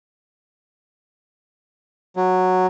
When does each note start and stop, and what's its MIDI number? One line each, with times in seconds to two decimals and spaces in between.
2.16 2.67 54